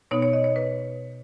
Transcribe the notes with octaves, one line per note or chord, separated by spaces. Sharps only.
B2 B3 D#4 C#5
C#5
D#5
C#5
B4